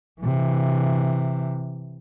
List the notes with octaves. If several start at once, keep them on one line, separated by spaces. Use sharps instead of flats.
C3 E3